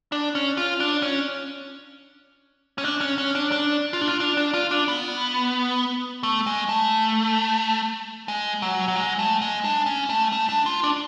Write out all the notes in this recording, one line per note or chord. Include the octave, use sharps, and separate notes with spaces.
D4
C#4
F4
D4
C#4
C#4
D4
C#4
C#4
D4
D4
F4
D4
F4
D4
D4
F4
D4
B3
A3
G#3
A3
G#3
F#3
F#3
G#3
A3
G#3
D4
C#4
A3
A3
D4
F4
D4